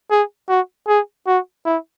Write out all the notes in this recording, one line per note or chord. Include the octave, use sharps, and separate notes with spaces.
G#4
F#4
G#4
F#4
E4